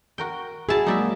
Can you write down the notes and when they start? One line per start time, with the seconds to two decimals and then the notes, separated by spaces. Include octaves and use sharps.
0.18 F#4 A#4 G5
0.69 E4 F#4 G#4 A5
0.86 F#3 G#3 A#3 D#4 D5 E5